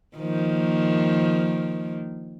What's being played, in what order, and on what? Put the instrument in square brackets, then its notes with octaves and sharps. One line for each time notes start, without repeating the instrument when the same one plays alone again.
[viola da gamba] D#3 F3 A#3